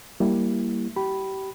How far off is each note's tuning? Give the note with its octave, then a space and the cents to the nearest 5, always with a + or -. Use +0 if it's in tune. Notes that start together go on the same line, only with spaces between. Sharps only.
G3 -5 A#3 +0 E4 +0
G4 -30 B5 -5